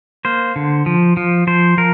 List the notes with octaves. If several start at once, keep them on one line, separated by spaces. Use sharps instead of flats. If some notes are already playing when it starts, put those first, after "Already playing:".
A#3 C5
D3
F3
F3
F3 C5
F3 A#4